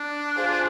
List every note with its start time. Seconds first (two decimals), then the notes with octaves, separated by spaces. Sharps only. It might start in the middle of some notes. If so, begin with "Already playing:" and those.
Already playing: D4
0.35 F4 G#4 C5